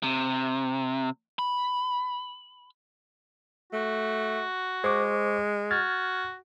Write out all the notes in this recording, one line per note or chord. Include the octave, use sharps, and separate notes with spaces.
C3
B5
A3 F#4
G#3 C5 C#6 D6
F#4 F6 G#6 A6